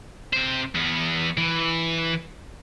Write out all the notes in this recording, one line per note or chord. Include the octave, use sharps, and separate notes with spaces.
C3 C5
E2 B3
E3